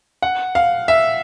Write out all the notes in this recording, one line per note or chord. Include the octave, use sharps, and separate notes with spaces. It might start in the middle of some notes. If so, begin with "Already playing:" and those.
F#5
F5
E5